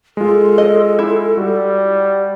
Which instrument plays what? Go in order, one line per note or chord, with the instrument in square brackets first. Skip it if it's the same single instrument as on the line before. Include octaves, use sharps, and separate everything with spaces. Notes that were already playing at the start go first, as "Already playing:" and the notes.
[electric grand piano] G#3 F4 [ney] A4
[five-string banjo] D#5
E4
[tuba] G3 [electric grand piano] F#4